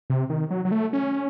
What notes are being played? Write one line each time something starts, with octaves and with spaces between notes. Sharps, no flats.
C3
D#3
F#3
F#3
A3
C#4